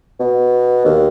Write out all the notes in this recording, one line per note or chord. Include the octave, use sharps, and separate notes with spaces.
B2
D#2